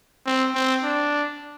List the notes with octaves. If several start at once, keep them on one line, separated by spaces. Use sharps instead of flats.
C4
C4
D4